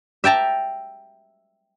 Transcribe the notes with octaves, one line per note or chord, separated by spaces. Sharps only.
E5 G5 A5 A#5